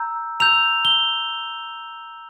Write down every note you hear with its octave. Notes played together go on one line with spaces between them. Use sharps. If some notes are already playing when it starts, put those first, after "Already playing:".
Already playing: A#5 E6 G6
A#5 E6 G6 F7
G7